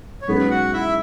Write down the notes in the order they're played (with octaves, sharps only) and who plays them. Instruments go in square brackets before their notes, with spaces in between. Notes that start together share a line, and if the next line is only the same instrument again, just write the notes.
[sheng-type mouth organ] C#5
[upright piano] B1 B2 G#3 C#4 G#4 [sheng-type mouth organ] B3 B4
[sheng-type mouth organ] F#4 F#5
E4 E5